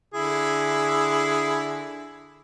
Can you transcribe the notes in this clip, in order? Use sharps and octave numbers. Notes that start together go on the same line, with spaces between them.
D3 E4 G#4